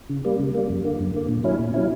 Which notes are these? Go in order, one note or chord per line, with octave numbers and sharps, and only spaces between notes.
C#3
G3 A#3
C#3
G3 A#3
F#2
D3 A#3
F#2
D3 A#3
A#2
F#3 C#4 E4
A#2
F#3 C#4 E4